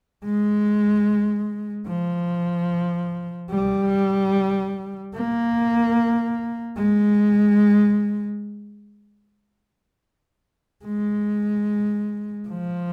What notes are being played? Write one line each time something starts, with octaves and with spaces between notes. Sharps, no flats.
G#3
F3
G3
A#3
G#3
G#3
F3